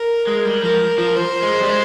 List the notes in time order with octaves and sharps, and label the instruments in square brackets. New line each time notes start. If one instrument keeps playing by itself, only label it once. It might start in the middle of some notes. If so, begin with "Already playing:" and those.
Already playing: [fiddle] A#4
[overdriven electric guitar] G#3
G3
[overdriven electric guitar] F3 [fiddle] A#4
[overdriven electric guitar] F3
[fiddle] C5
[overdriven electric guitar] G#3
G3
G#3